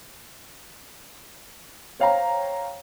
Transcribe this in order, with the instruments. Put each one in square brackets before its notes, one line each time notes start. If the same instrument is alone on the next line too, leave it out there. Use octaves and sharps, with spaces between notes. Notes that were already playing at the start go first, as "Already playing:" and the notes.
[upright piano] C5 C#5 F5 G5 A#5